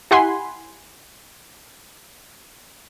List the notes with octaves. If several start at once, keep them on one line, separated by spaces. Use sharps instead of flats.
E4 G4 F#5 G#5 B5 C6